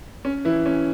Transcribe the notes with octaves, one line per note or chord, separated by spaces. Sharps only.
C#4
E3 E4
C#4